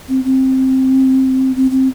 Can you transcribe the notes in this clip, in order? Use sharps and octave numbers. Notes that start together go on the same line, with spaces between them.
C4
C4
C4
C4